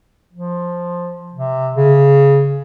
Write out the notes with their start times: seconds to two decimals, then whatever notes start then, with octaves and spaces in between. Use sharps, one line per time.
0.33 F3
1.34 C3
1.75 C#3